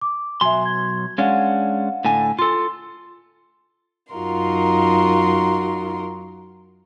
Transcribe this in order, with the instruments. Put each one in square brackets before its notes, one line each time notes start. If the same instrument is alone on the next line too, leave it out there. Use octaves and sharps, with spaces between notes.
[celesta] D6
[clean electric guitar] B1 F#3 C6 [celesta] E5 G#5
[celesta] G#6
[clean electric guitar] G#3 C#4 D4 [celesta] F5 F#5
[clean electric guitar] A2 D3 G#5
[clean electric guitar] F4 A4 [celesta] C6 E6
[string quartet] F#2 D#4 F4 F#4 A#4 C6